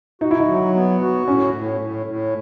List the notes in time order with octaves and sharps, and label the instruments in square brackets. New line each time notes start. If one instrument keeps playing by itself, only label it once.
[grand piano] D#4 [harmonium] F#4
[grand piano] E4
D#4
[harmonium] F#3
B3
F#4
[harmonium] A2 [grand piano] C#4
[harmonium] A2
A2
A2